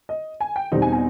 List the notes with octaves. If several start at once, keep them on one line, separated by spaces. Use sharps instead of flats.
D#5
G#5
G5
E2 B2 G3 C4 D#4
G#5
G#5